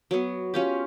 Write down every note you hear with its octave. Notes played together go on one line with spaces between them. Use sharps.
F#3 B3
C#4 F4 G4